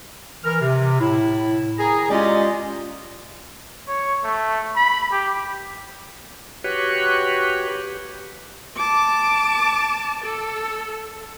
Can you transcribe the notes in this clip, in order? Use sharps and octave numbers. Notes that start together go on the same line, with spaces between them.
E3 A#4 F6
C3
A2 E4
D#3 G#4 A#5
G#3 C#4 F4 G4 D5 D#5
C#5
A3
B5
G4
F#4 G4 B4 C#5
G4
A5 D6
A4